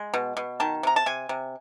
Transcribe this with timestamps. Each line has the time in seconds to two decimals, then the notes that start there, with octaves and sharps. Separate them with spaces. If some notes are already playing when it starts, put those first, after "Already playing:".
Already playing: G#3
0.14 B2
0.37 B2
0.60 D#3 A5
0.83 C3 A#5
0.96 A5
1.06 C3 G#5
1.29 C3